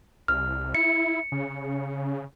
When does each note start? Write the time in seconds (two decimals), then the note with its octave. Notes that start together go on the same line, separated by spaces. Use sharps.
0.28 C2 F6
0.75 E4 C#7
1.32 C#3